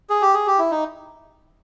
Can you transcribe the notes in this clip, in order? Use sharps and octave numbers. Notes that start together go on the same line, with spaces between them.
G#4
G4
G#4
G4
E4
D#4